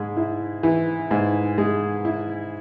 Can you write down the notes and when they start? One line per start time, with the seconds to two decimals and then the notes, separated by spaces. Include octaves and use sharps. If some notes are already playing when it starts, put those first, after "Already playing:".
Already playing: G#2 G#3
0.17 E4
0.63 E3
1.11 G#2
1.58 G#3
2.05 E4